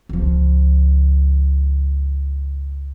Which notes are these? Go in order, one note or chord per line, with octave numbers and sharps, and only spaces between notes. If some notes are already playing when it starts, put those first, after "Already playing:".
C#2 F3